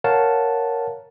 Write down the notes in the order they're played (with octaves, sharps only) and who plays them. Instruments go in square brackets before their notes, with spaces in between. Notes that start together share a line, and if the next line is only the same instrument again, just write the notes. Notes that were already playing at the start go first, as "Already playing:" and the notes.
[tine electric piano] A#4 C#5 F5 F#5 A5